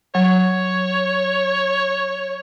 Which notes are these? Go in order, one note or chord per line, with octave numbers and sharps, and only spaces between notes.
F#3 C#5